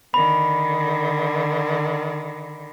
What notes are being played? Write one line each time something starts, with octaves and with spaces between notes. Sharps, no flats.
D3 D#3 B5